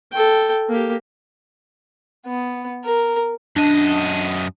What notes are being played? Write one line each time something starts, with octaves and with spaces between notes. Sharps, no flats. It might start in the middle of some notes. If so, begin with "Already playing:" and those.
A4 G5
A#3 G4
B3
A#4
F#2 D4 D#5